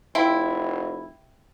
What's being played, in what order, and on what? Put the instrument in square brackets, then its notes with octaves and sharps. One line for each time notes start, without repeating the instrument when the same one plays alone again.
[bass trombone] F1 [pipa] E4 [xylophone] F5 G5 C6